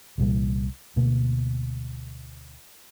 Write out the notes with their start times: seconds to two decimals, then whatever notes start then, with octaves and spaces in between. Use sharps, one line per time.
0.18 C2 A#2 E3 G3
0.96 D2 B2 A#3